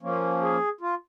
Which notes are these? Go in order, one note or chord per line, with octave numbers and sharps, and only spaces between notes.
F3 A#3 C#4
G#4
F4